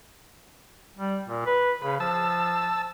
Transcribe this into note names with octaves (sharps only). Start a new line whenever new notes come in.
G3
A#2
B4
C#3 B4
F3 A5 E6